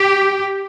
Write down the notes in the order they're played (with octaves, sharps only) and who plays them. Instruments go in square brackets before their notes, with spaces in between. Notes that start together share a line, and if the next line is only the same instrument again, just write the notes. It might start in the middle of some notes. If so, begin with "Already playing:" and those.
Already playing: [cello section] G4